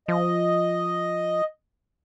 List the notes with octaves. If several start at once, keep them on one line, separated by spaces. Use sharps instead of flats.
F3 D#5